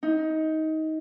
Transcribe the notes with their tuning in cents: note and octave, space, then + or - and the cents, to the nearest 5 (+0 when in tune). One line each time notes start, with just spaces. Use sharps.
D#4 +20